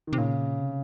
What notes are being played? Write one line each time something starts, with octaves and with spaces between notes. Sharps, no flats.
D#3
C3
A#2 C#3
C3